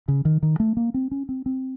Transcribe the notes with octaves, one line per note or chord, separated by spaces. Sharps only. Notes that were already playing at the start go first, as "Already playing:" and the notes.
C#3
D#3
D#3
A3
A#3
C4
C#4
C4
C4